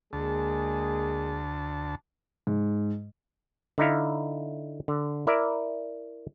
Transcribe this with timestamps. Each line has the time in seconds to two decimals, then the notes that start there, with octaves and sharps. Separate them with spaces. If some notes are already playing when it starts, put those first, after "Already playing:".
0.13 D2 G#3 A#3 G#4 A5
2.47 G#2
3.78 D3 D#4 E4 F5
4.88 D3
5.27 E4 A#4 D5 E5